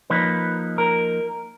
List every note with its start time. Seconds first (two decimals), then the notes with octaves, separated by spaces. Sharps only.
0.10 F3 A#3 D#4 B4
0.78 A#4